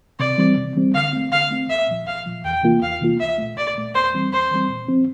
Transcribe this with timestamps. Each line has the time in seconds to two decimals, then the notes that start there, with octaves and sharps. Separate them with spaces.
0.19 C3 D5
0.38 E3 G3 C4
0.57 C3
0.76 E3 G3 C4
0.94 D3 F5
1.13 A3 C4
1.32 D3 F5
1.51 A3 C4
1.70 C2 E5
1.88 A#2 F3
2.07 C2 F5
2.26 A#2 F3
2.44 E2 G5
2.63 C3 E3 A#3 F4
2.82 E2 F5
3.01 C3 E3 A#3 F4
3.20 C2 E5
3.38 A#2 A3
3.57 C2 D5
3.76 A#2 A3
3.95 E2 C5
4.14 E3 G3 C4
4.32 E2 C5
4.51 E3 G3 C4
4.70 A#2
4.88 F3 C4